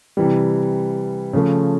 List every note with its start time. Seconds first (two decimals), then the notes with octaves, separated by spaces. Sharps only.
0.17 C3 E3 G3
1.33 C#3 F3 A3